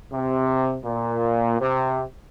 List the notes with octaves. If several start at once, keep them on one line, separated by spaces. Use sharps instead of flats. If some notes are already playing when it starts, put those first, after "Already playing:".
C3
A#2
C3